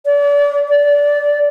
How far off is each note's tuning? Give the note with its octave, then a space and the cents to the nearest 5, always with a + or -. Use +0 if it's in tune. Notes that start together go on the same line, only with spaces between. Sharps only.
D5 -35
D5 -20